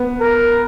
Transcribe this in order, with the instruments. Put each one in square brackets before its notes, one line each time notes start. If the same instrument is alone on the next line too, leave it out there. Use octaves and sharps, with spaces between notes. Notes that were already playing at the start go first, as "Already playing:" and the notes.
Already playing: [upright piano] B3
[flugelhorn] A#4